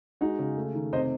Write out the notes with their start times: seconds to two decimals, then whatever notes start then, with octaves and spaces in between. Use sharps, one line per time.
0.21 G#3 D#4 F#4
0.39 C#3
0.57 A3
0.75 D#3
0.93 C3 C5 D#5